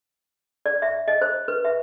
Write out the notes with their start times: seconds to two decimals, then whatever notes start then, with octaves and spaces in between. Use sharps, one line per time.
0.66 D5
0.82 E5
1.08 D#5
1.21 C5
1.48 B4
1.65 E5